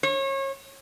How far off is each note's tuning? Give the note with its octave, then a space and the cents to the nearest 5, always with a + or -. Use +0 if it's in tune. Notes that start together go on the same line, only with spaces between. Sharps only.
C#5 -30